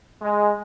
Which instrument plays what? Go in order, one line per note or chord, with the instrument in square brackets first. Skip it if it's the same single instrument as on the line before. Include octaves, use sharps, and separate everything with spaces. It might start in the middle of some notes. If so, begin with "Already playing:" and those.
[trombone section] G#3